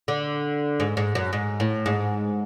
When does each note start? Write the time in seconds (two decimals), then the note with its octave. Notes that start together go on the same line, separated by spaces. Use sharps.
0.08 D3
0.80 G#2
0.97 G#2
1.15 F#2
1.33 G#2
1.60 A2
1.86 G#2